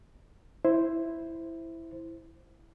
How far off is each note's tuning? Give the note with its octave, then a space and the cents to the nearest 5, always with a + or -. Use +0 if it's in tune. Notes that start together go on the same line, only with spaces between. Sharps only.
E4 +0 C5 +0